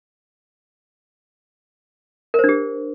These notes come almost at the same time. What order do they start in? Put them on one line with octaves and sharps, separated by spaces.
A#4 C5 D4 G4